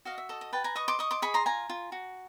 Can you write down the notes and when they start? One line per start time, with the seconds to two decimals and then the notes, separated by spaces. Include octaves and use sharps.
0.05 F#4 D#5 F5
0.18 E5
0.29 A4 D#5
0.41 D#5
0.53 B4 G5 A5
0.64 G#5 A#5
0.75 D#5 C#6 D#6
0.88 C6 D6
0.99 D#5 C#6 D#6
1.11 C6 D6
1.22 G#4 B5 C#6
1.34 A#5 C6
1.46 F4 G#5 A#5
1.70 F4
1.92 F#4